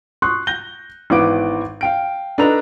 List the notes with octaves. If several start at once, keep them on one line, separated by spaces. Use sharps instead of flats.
C6 C#6 D#6 F#6
G6 A#6 G7
G#1 E3 B3 D6 D7
F5 G5 D7
D4 D#4 A4 B4 A#5 F7